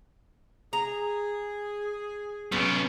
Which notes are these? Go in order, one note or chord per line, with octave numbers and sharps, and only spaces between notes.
G#4 A#5
B1 B2 C#4